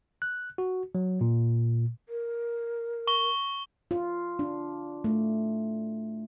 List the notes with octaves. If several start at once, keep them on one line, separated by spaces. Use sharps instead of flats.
F#6
F#4
F#3
A#2
A#4
C#6 G7
F4
D4
A3